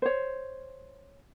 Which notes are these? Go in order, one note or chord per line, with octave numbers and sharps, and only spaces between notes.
C5 C#5